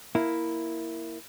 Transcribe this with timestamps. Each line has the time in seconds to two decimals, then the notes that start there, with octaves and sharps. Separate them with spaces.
0.15 A#3 E4